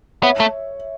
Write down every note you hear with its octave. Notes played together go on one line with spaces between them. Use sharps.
B3 C#5 E5
A3